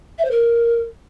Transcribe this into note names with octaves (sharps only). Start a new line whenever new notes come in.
E5
C5
A#4